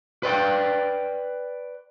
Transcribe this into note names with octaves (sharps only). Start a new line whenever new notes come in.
B4 D5 G5